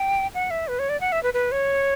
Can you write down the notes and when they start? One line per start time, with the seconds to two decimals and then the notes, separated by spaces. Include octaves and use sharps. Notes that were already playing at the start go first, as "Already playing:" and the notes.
Already playing: G5
0.35 F#5
0.50 E5
0.68 B4
0.79 C#5
0.89 D5
1.01 F#5
1.12 E5
1.23 B4
1.34 B4
1.52 C#5